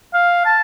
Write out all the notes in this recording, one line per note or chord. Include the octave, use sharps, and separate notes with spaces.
F5
A5